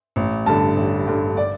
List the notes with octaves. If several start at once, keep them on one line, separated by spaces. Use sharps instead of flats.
A1
G2 D3 A5
A1
G2 D3
D5